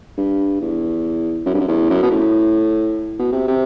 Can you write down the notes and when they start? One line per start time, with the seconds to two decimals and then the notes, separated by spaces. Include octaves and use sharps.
0.18 G2
0.61 E2
1.46 F#2
1.54 G2
1.61 F#2
1.68 E2
1.90 F#2
2.03 B2
2.11 A2
3.19 B2
3.32 C3
3.48 C3